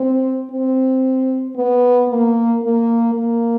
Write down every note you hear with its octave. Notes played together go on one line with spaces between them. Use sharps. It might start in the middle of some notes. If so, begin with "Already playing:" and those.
Already playing: C4
C4
B3
A#3
A#3
A#3